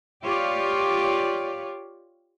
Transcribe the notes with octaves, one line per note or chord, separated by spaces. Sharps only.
F4 G4 C#5 D5